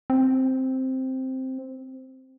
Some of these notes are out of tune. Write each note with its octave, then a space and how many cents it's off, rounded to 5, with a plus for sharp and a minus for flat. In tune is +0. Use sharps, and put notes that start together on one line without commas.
C4 +0